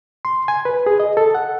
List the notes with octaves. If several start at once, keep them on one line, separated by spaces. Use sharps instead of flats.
C6
G#5
B4
G#4
D#5
A4
F#5